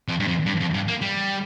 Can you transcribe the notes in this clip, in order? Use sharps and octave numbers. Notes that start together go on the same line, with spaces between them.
F2
G2
F2
G2
F2
G2
A#3
G3